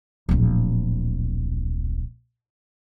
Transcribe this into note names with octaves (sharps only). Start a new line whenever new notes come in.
D1 A#1